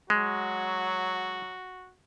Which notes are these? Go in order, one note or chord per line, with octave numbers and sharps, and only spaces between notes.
F#3 G#3 F#4